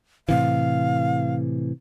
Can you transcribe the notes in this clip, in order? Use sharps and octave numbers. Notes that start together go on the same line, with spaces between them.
A2 C3 E3 F5